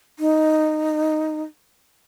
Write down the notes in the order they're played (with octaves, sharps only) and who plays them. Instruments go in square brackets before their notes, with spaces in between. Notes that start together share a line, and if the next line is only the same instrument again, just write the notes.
[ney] D#4